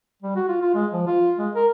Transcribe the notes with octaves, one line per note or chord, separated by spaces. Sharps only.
G3
F#4
F4
F4
G#3
F3
F4
G#3
A#4